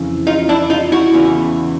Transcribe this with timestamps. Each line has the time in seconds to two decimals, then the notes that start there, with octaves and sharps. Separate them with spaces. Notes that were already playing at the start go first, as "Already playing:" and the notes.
Already playing: F2 C#3 E3
0.27 D#4 F4
0.49 D4 E4
0.70 D#4 F4
0.92 E4 F#4
1.13 E2 C#3 E3